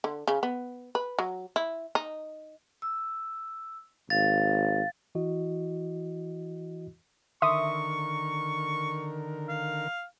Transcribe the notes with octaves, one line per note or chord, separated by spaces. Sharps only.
D3
C#3
B3
B4
F#3
E4
D#4
E6
G#1 F5 A6
E3 E4 F#4 D#5
D3 D#3 A#4 E5 C6 C#6 D#6
F5